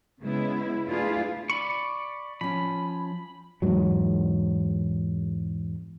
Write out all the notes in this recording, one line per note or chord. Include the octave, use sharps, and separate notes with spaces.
C#3 G#3 B3 E4
A3 D4 E4 F4 G#4 B4
D5 B5 C#6
F3 C#4 B5
E2 G#2 F#3